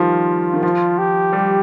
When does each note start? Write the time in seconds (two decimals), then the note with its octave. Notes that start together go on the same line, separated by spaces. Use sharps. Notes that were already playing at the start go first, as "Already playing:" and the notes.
Already playing: D#3 F3 G3 F4
0.54 D#3
0.63 F3 F4
0.99 G4
1.33 G3